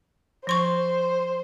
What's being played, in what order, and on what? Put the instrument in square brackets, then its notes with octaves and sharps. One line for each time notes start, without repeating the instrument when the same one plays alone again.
[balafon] F3 C6 C#6 [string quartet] C5